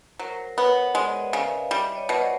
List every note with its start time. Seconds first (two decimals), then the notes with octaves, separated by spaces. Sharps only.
0.19 F#3 A#4 C5
0.57 B3 B4 C#5
0.95 G#3 C5 D5
1.12 D#5
1.20 D5 E5
1.33 C#3 F5
1.45 D5 E5
1.71 G3 D5 E5
1.96 C#5 D#5
2.09 B2
2.21 C5 D5